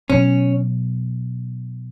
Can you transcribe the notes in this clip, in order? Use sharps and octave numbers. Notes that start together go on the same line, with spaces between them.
B2 F#3 B3 C#4